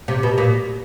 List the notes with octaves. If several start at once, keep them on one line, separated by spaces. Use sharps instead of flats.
C3
B2
A#2